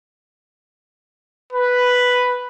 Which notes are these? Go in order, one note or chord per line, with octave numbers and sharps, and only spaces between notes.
B4